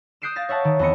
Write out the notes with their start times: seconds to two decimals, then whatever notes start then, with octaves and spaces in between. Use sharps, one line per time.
0.22 D#6 F#6 G6 C7 D7 E7
0.36 F5 A6 A#6
0.49 C#5 E5 F#5 A5
0.65 D#3
0.79 E2 C4 E4 D#5 C#7